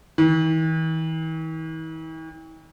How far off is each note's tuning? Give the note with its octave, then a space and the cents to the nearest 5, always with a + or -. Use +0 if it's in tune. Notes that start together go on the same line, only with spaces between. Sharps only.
E3 -45